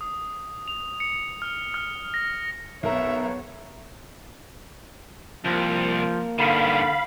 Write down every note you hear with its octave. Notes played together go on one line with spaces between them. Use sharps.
D#6
F7
C#7
F6
F6
A#6
B1 B3 A#4 C#5 E5 A#5
C2 F3 A#3
G2 D3 D#3 F5 B5